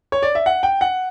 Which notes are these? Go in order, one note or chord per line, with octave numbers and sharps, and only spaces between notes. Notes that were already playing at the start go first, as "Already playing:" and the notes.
C#5
D5
E5
F#5
G5
F#5